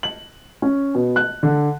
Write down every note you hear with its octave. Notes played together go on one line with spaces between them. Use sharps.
F#7
C#4
B2
F#6
D3